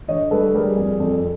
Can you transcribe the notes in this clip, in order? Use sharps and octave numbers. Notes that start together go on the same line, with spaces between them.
D3 C#5 D#5
G3 A4 B4
G3 G#4 A#4
F2 G#4
F2 A4